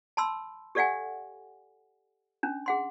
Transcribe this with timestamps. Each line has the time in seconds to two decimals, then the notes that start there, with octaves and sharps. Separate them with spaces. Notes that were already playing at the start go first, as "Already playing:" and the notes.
0.17 A5 B5 C6 E6
0.75 G4 A4 D5 F5 F#5 G#5
2.43 C#4 D4
2.66 G#4 F#5 C6